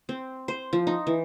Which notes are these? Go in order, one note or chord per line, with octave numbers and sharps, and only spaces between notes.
C4
C5
F3
D#4
E3